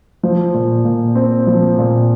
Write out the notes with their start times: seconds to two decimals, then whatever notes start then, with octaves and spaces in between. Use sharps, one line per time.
0.23 F3
0.54 A#2
0.84 A#2
1.15 C4
1.47 F3
1.78 A#2